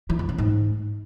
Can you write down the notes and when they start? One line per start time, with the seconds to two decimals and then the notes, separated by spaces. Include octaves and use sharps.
0.10 E3
0.19 F2
0.29 C#3
0.38 G#2